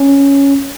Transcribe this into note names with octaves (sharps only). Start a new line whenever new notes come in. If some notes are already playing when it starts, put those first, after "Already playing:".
Already playing: C#4